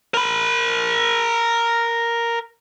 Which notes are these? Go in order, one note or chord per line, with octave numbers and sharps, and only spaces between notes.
A#4 B5